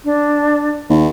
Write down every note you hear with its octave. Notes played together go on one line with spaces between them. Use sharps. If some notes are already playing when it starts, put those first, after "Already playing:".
D4
D#2